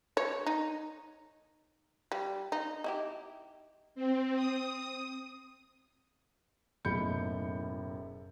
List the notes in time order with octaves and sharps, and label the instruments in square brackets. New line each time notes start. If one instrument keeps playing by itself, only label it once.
[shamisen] C#5
D#4
G3
D#4
D#4 E4 G4
[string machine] C4
D#6
[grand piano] F#1 B1 A2 B5 G6 C#7